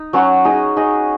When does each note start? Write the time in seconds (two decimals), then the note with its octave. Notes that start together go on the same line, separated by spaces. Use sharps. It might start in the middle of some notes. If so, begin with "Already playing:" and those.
Already playing: D#4
0.13 F#3 C#4 F#4
0.45 D#4 G#4 D#5
0.76 D#4 G#4 D#5